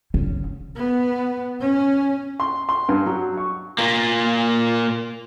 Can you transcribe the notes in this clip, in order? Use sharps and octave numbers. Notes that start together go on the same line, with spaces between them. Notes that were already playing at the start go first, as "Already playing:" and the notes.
C#3
B3
C#4
C6
C6
G2
F#3
C#6
A#2 A#3